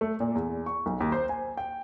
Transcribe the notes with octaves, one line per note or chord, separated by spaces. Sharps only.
A3
A#2
E2
C#6
B1
D#2
C5
G#5
G5